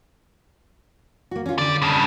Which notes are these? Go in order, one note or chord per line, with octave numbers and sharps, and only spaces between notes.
A#3 F#4
C#4 F4
D3 G3 D5
G2 C#3